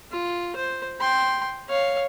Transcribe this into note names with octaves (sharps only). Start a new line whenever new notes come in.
F4
C5
G5 C6
C#5 F5